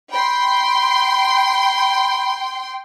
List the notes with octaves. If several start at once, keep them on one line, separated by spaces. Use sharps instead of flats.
G5 B5 C6